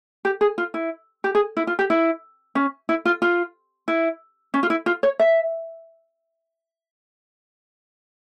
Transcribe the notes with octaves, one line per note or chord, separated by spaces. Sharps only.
G4
G#4
F4
E4
G4
G#4
E4
F4
G4
E4
C#4
E4
F4
F4
E4
C#4
F4
E4
F4
C#5
E5